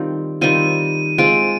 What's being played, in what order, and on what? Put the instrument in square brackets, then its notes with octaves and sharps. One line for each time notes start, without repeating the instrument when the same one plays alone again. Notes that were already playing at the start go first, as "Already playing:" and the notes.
Already playing: [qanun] D#3 G3 C4 F4
[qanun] D#3 G3 C4 F4 [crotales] D#7
[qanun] G#3 C4 F4 [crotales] D7